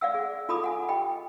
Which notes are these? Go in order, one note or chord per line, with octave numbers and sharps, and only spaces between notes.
D5 F5 F#5 E6
G#4
F4 A4 A#5 B5 D6 D#6
F#5 G#5
G4 D#5 G5 B5